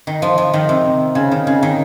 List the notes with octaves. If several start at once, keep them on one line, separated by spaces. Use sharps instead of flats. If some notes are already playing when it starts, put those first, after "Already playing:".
D#3
F3
F3
D#3
C3
C#3
D#3
C#3
D#3